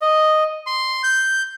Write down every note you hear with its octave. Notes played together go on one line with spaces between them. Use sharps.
D#5
C6
G6